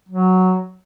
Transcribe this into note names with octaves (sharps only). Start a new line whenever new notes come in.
F#3